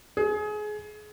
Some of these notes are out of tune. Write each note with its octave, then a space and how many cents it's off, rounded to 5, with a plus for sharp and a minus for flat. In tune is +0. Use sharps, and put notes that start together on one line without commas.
G#4 +25